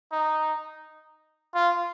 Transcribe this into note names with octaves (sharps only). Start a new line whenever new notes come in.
D#4
F4